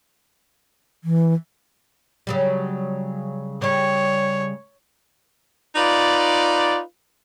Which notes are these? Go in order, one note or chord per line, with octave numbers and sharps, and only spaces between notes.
E3
C#3 F#3 G3
C#3 G3 C#5
D#4 F4 B4 D5